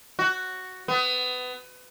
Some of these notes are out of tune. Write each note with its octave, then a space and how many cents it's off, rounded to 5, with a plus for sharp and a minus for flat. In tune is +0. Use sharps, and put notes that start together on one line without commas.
F#4 +5
B3 +25